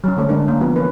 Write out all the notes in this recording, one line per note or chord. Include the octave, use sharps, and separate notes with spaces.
F#3 C#4
D3 A3 C#4
D3 G#3 D4 A#4
A#3 C#4
E3 F3 B3 F4
E3 C#4 A#4 B4